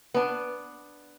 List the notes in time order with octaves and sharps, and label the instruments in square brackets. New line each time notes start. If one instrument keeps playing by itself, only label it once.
[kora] B3 D4